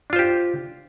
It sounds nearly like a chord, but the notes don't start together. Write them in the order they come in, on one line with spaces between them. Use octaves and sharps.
D4 F4 C5 G4